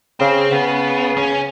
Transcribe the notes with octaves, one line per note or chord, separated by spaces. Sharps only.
C#3 C4
C#3 B3
C#4